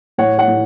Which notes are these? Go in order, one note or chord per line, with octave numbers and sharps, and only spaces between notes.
A2 C#5 F#5
C#5 F#5
A2